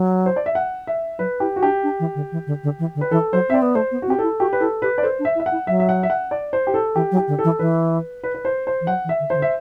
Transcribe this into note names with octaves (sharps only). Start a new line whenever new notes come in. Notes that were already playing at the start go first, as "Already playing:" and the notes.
Already playing: F#3
C5
D5
E5
F#5
E5
F#3 B4
E4 G4
F#4
D4 G4
D4
E3
D3
E3
D3
D3
E3
D3
B4
E3 A4
F#3 C5
C4 D5 E5
B3
A3 C5
B3
F#4
C4
G4
E4 A4
F#4 G4
B4
E4 A4
G4 B4
D5
A4 C5
D4
E5
E4
E5
F#5
E4
F#3 E5
E5
F#5
E5
F#5
D5
C5
G4
A4
E3 G4
F#3
G4
D3
A4
E3
E3 B4
B4
B4
C5
C5
E3
F#3 F#5
E3
E5
D3
E3 C5
D3
E5